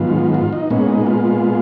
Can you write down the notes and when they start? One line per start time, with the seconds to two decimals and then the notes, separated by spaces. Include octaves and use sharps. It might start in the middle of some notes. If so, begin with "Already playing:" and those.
Already playing: G#2 D#3 F#3 B3 F4
0.34 F4
0.53 D#4
0.70 A#2 G#3 B3 C#4
0.88 D#4
1.06 F4
1.25 F4